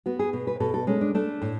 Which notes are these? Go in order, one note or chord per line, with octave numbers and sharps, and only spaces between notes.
B3 F#4
G#4
B2
B4
B2 A4
A4
G#3 C#4
D4
A3 D4
A2